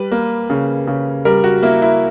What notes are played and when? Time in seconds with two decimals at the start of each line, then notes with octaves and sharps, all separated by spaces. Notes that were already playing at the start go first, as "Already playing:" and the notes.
Already playing: G3 B4
0.11 A#3
0.50 C#3
0.87 C#3
1.25 G3 A#4
1.44 F#4
1.63 A#3 E4
1.82 E4